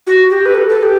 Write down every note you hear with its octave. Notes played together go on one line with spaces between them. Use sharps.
F#4
G4
B4
A4
A4
A4
G4